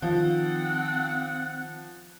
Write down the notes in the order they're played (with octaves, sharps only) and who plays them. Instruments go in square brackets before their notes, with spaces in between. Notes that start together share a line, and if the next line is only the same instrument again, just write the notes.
[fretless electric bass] D#3 [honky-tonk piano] F3 [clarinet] C4 [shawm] F#5